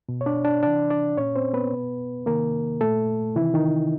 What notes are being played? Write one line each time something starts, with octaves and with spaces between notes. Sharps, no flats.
B2
C#5
D4 D5
D4 D5
C3 E3 D4 D5
D4 D5
A#2 C#4 C#5
C4 C5
B3 B4
B2
C3 D#3 A#3 A#4
A#2 A3 A4
C3 D#3 E3 E4
D#3 D#4